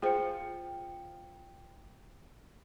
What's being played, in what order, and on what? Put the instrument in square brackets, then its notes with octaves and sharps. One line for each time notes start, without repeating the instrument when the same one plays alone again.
[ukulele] F4 [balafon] G#4 C5 [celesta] G5 C#7